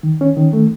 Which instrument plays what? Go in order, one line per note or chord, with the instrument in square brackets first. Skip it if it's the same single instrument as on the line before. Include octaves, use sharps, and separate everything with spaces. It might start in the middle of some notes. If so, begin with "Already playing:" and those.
[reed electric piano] D#3
C#4
D#3
A3